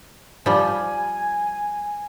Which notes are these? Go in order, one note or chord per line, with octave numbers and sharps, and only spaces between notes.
F3 G3 G#5